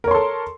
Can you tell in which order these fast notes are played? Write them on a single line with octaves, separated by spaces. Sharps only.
A#4 C#5 C6 A4